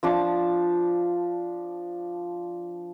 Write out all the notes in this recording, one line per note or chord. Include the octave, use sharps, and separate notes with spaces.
F3 D4 D6